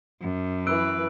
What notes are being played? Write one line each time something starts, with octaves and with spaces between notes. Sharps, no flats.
F#2
E3 B4 E6 F#6 D7